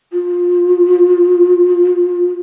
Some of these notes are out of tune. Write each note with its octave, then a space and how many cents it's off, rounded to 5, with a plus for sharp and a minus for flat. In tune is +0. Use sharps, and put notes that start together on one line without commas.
F4 +25